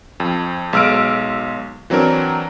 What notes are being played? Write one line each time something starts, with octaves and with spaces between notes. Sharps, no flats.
F2
B1 G#3 E6 F6 D7
E3 F#3 C4 D4 A#4